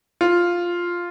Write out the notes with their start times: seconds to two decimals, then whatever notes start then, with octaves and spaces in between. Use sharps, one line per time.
0.21 F4